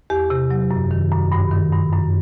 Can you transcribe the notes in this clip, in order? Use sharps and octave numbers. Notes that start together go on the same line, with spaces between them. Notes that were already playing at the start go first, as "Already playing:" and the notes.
E2 G4
C3
F#3
F#2
D#3
F#2
G2
D#3
G2
F#2